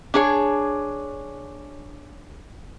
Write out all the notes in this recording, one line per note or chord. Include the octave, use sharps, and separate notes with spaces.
D4 G#4 C#5